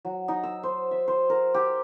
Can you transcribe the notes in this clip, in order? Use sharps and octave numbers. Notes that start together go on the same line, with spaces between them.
F#3
D#4
E6
C5
E5
C5
A#4
G4